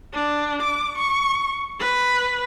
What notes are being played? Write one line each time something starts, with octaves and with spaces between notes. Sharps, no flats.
D4
D6
C#6
B4